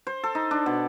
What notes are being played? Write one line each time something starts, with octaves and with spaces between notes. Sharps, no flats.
C5
A4
D#4
D4
B2